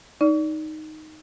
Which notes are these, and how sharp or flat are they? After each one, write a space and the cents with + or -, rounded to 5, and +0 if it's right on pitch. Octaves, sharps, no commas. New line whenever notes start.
D#4 +0 D5 -20